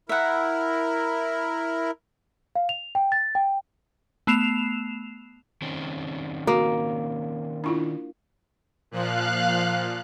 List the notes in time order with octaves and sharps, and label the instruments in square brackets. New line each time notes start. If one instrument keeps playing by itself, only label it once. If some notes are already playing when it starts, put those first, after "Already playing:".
[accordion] E4 A#4 [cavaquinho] E5 F#5
[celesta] F5
F7
G5
A6
G5
[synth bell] A3 B3 C7 E7 F7
[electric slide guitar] D#3 C4 C#4
[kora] A#3 [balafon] F#4
[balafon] D4 E4 F4
[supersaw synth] A#2 F3 [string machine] F5 F#6